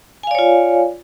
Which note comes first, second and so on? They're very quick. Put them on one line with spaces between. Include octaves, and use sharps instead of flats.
G#5 F5 D5 C#5 F4